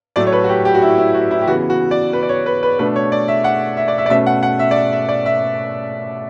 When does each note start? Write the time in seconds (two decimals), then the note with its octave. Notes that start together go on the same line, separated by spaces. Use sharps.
0.16 A2 F#3 A3 D5
0.27 C#5
0.32 B4
0.44 F#4
0.49 G4
0.65 G4
0.74 F#4
0.82 E4
0.98 E4
1.14 F#4
1.31 E4
1.41 G4
1.47 C#3 E3 B3 F#4
1.70 F#4
1.91 D5
2.13 B4
2.23 D5
2.29 C#5
2.46 B4
2.63 B4
2.79 B2 A3 D4 B4
2.96 C#5
3.12 D5
3.28 E5
3.44 F#5
3.77 E5
3.88 D5
3.98 E5
4.06 D5
4.10 B2 A3 C#4 E5
4.27 F#5
4.43 F#5
4.59 E5
4.71 D5
4.76 E5
4.92 E5
5.09 D5
5.26 E5